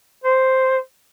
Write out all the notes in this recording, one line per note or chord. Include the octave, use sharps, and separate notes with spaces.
C5